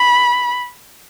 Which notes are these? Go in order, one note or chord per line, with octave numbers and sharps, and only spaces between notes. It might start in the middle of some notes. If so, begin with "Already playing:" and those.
Already playing: B5